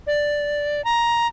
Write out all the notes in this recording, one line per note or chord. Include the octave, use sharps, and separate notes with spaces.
D5
A#5